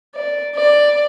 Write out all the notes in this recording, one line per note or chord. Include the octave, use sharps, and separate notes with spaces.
D5
D5